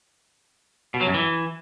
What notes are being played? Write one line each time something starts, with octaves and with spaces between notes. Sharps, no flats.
B2
F#3
F#2
E3